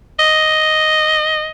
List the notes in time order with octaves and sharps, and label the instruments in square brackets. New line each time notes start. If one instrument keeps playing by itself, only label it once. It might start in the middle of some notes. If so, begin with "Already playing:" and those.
[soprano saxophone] D#5